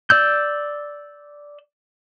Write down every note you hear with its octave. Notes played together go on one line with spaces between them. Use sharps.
D5 E6 G6